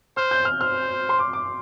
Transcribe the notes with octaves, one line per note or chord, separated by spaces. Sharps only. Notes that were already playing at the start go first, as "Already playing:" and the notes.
C5 F6
G6
F6
C5 F6
C6
D6
D6